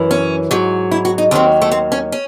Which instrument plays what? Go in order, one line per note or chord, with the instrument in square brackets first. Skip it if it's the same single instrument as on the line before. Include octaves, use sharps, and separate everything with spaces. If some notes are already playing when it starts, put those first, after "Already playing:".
Already playing: [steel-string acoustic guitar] F#2 E3
C#4
G#2 F#3
E4
F#4
D#4
D#2 D#3 F#3 C4
A3
C4
C#4
C#4